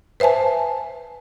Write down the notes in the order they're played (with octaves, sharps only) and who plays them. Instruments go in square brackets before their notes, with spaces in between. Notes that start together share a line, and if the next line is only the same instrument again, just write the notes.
[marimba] B4 C5 E5 G#5 A5